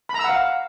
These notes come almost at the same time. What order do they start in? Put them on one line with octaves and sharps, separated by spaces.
B5 A#5 E6 F#5 F5